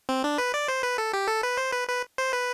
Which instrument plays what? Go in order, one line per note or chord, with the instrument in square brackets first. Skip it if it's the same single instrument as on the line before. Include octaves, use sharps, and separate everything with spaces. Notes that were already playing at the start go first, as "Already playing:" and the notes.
[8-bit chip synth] C4
D4
B4
D5
C5
B4
A4
G4
A4
B4
C5
B4
B4
C5
B4